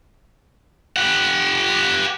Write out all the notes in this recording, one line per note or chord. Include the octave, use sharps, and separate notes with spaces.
G4 F#5